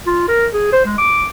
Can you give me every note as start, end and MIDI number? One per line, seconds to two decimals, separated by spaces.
0.06 0.28 65
0.28 0.46 70
0.53 0.71 68
0.73 0.80 72
0.85 0.96 56
0.98 1.28 86